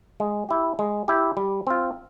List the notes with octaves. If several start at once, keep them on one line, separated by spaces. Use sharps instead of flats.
G#3
E4 G4
G#3
E4 G4
G3
C4 F4